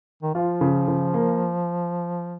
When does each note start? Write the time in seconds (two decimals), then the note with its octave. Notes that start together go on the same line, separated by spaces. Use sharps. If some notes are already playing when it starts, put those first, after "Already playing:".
0.22 D#3
0.35 F3 F4
0.61 C#3
0.88 C#3
1.14 A#3